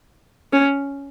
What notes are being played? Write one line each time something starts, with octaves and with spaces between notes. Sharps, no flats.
C#4